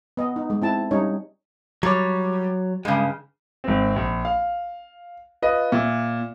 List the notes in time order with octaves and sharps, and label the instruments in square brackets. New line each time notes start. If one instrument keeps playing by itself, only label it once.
[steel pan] B3 D#5
D#4
G#3
C4 E4 A5
G3 C#4 D#4 C#5
[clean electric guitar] F#3 C#5 [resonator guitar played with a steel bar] G3
[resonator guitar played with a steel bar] G2 C#3 [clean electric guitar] G#3
[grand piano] G#1 C4
A#1
F5
F4 B4 D#5
A#2 E5